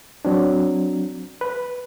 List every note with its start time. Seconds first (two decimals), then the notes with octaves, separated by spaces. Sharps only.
0.25 F#3 C4 D4
1.41 B4